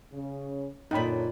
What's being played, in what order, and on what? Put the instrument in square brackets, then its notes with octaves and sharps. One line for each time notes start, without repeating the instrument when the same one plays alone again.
[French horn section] C#3 C#4
[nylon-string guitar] F#2 A#2 [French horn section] D3 A4 C#5 [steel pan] D#4 G5 B5